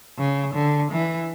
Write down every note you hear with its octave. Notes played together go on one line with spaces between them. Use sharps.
C#3
D3
E3